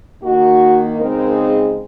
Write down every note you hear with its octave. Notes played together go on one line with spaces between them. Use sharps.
D#3 A#3 D#4 F#4
C#3 G#3 C4 D#4 A#4
G#4